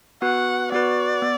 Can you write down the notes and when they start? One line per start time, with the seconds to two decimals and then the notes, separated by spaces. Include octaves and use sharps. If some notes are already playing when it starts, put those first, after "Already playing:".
0.22 B3 F#4 B4 F#5
0.72 B3 F#4 B4 D5
1.22 B3